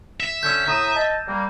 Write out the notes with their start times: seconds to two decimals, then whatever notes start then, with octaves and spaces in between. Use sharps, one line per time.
0.20 E5
0.43 D3 C#4 E6 G6
0.67 A2 A#5 D#6
0.95 D#5 A5
1.28 G3 A#3